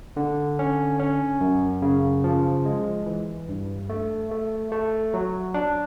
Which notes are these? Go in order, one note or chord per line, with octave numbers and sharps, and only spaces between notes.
D3
C#4
C#4
F#2
C#3
F3
G#3
E3
G2
A3
A3
A3
F#3
D4